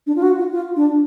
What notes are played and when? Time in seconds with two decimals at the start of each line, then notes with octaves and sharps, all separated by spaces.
0.07 D4
0.16 F4
0.22 F#4
0.38 F4
0.53 F4
0.76 D4